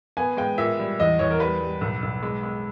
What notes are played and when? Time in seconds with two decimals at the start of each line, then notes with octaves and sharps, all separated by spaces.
0.17 B3 G#5
0.37 G#3 G5
0.58 A#2 E5
0.79 G3
1.00 E2 D#5
1.19 E2 C#5
1.31 A#4
1.40 G3 B4
1.61 G3
1.81 B1
2.02 B1
2.23 G#3
2.43 G#3